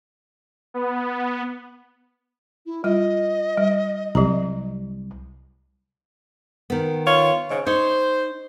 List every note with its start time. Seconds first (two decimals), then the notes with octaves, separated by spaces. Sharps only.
0.74 B3
2.66 E4
2.84 G3 F4 D#5
3.58 G3
4.15 C2 F#3 G4 A#5
6.70 D#3 B3
7.06 F4 C#5
7.51 G#2 C#3
7.66 D#4 C5 C#5